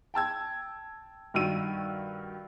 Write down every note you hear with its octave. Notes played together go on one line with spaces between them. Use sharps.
G5 A5 E6 G#6
G2 D#3 F#4 E6 D#7